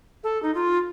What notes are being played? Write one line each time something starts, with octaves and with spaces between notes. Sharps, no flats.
A4
D#4
F4